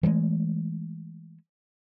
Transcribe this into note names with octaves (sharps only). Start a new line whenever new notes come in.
E3 F#3 G#3 A3